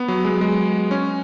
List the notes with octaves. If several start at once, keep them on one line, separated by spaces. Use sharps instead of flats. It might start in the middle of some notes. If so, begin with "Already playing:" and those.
Already playing: B3
F#3
G#3
G#3
C#4